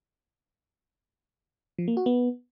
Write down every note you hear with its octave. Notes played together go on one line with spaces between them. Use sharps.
F3
A#3
F#4
B3